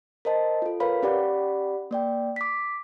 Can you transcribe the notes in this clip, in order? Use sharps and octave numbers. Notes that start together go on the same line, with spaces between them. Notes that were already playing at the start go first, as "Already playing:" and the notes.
A#4 C5 D#5 A5
F4 A4
A#4 B4 C#5 F5 B5
C#4 G4 D5 F#5 B5
A#3 D5 G5
D6 B6